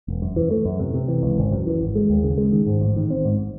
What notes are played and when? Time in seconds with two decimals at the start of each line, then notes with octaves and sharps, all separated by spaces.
0.08 E1
0.22 F#2
0.36 E3
0.51 A3
0.65 F#2
0.80 C3
0.94 C3
1.08 E3
1.23 C#2
1.38 G#1
1.52 F#2
1.66 E3
1.81 G#1
1.95 G#3
2.10 D#2
2.24 C#3
2.38 G#3
2.52 D#3
2.66 G#2
2.81 A1
2.96 D#3
3.10 C4
3.25 G#2